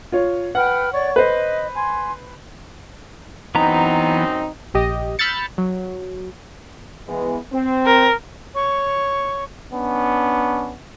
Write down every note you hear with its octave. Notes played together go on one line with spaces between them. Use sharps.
F4 C#5
B4 F#5 G5 F6
C#5 D5 C#6
B4 C5 D#5
G#5 C6
F#2 E3 B3 C4 D#4 A#5
A#1 G4 D#5
B5 E6 F6 G6 A6 C#7
F#3
E3 G#3 B3
C4
A#4
C#5 C#6
B3 C#4 D4